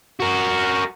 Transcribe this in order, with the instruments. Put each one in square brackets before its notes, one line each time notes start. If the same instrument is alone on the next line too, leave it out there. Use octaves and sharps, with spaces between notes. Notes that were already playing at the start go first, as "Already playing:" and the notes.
[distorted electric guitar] F#4 A#4